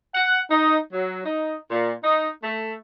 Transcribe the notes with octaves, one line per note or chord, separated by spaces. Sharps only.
F#5
D#4
F#3
D#4
A#2
D#4
A3